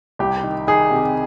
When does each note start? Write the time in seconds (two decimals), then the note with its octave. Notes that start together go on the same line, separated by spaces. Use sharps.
0.19 C2 G4
0.43 D#3
0.67 D#3 G#4
0.91 C3